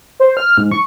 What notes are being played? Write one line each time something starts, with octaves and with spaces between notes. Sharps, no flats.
C5
F6
G#2
C#6